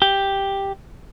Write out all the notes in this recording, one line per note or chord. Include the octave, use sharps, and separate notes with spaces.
G4